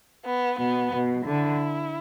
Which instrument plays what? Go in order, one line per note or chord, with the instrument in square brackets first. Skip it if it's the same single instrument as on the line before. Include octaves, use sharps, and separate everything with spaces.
[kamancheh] B3
[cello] B2 [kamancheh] B3
[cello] B2
[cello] D3 [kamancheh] E4